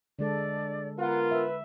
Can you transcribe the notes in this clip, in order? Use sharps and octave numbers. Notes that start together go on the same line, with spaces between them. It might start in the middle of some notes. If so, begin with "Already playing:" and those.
D3 G#3 A4 D5
B3 F4 A#4 F#5
B4 E5